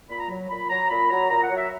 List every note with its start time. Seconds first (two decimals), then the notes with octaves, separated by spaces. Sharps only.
0.09 A#2 B5
0.19 A#5
0.29 F#3
0.49 A#2 B5
0.70 F#3 A#5
0.89 A#2 B5
1.10 F#3 A#5
1.30 A#2 A#5
1.43 F#5
1.50 F#3
1.57 E5